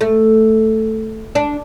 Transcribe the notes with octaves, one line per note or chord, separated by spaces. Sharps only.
A3
D4